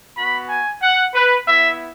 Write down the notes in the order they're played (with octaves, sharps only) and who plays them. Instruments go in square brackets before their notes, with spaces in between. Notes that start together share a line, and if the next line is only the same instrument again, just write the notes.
[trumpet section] B3 F#4 B5
G#5
F#5
B4
B3 E4 E5